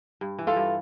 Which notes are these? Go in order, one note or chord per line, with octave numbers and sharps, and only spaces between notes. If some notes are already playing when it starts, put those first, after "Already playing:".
G2
E3
F4 A4
G2